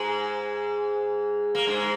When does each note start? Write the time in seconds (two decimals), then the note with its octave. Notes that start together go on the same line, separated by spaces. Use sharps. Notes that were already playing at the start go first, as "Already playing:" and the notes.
Already playing: G#2 G#3
1.55 A#3
1.67 G#2 G#3